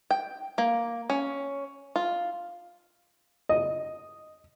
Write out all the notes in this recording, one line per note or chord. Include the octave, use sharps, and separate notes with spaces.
G5
A#3
C#4
F4
D#5